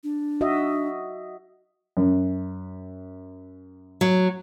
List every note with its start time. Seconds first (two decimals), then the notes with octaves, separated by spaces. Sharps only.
0.04 D4
0.41 F#4 D#5 E5
1.97 F#2
4.01 F#3